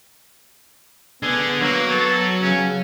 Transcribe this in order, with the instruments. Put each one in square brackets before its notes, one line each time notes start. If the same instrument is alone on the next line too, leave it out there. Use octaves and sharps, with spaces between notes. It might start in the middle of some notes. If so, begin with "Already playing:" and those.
[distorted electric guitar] D3 [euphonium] B3 [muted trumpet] G#4
[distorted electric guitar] F#3 [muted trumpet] A#3
[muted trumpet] A4
[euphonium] C#3 [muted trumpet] C#4